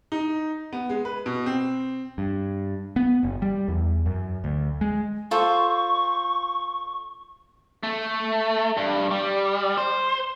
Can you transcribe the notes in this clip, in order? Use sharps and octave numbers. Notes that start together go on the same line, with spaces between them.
D#4
B3
G#3
B4
B2
C4
G2
B3
F#1
G3
E2
F#2
D2
G#3
F4 A4 C5 C#6
A3
G2
G3
C5